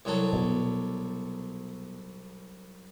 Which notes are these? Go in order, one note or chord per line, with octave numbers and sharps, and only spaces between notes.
C2 F#3 A4
B2